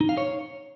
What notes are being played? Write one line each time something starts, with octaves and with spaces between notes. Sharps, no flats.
D#4
F5
C#5